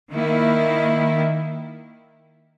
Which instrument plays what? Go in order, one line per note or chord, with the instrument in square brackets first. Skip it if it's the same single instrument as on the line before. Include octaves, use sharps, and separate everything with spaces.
[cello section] D#3 A#3 E4